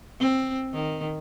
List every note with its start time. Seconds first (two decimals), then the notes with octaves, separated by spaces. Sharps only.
0.20 C4
0.73 D#3